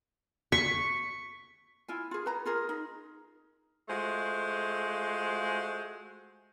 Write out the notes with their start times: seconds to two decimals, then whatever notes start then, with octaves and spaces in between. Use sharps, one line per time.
0.52 C#6 B6
1.88 E4 F4 G#5
2.11 F4 G#4
2.26 B4 A#5
2.45 F4 G#4 A#4
2.69 D#4
3.89 G#3 A3 F4 F#4 C5